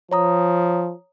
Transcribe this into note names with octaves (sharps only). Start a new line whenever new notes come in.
F3 C#5 A#5 D#6